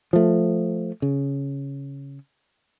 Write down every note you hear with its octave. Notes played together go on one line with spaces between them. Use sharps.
F3 A3
C#3